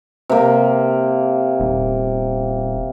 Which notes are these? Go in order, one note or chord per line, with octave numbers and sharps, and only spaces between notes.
C3 A#3
D#1